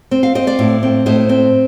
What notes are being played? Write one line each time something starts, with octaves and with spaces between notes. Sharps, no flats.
C4
F5
C4 D#5
D5 F5
A2
C4
A2 C5 D#5
C4